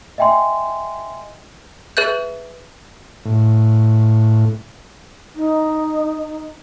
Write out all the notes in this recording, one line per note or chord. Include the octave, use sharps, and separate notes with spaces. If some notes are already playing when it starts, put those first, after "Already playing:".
D#5 E5 G5 G#5 C6
G#4 B4 E5 F#6 G6
A2
D#4